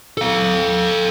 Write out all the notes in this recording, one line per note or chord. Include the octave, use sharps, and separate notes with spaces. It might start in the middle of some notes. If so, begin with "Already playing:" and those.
A4 F5